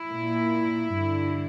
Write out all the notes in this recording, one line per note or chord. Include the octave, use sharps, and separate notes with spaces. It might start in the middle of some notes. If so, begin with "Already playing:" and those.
Already playing: E4
A#2
G2 D3